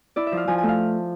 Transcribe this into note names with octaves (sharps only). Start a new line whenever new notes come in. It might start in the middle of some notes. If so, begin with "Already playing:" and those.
E4 D5
E5
F3
F5
F3 G#5
G#5
A3 F5